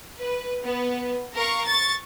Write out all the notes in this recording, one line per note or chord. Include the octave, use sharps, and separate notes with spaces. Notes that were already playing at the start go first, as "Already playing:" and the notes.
B4
B3
A#4 F5 C#6
C#6 A6